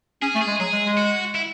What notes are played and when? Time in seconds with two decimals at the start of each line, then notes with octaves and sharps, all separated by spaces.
0.22 C#4 G#4
0.35 A3
0.42 G#4
0.48 G#3
0.60 F#3 G#4
0.73 G#3
0.86 G#3
0.97 F#4
1.35 E4